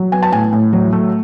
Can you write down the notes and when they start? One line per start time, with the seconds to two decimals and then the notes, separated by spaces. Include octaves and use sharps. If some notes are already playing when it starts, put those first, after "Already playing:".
Already playing: F#3
0.12 B3 G#5
0.23 A5
0.32 A2 G#5
0.52 A2
0.73 F#3
0.93 A3